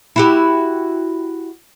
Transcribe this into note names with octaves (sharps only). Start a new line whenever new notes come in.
E4 F#4 G4